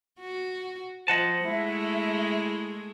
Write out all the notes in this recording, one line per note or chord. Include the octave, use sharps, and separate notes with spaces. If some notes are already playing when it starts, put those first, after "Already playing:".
F#4
F3 C5 D#5 F#5 A5
G#3 A3 E4 E5